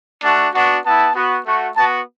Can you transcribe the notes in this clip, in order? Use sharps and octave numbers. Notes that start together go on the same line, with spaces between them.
A3 D4 F#4 A5
B3 D4 F#4
B3 E4 A5
B3 F#4
A3 F#4
B3 F#4 A5